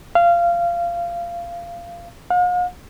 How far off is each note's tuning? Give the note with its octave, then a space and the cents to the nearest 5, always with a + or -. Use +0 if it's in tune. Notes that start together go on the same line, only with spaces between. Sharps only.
F5 -20
F5 +45